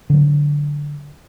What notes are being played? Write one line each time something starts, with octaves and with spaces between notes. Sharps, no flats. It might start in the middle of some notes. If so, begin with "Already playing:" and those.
D3 F#3